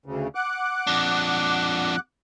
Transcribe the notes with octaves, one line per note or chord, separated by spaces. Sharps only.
D2 C#3
F#5 D6 F#6
F2 D4